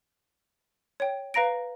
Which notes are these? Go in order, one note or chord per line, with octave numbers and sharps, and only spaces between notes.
C#5 G5
B4 F5 A#5 A#6 D7